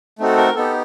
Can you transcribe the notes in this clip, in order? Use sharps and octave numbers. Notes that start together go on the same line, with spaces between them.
A3 C4 D#4 F#4 A4
A#4
B3 D#4 G4 A4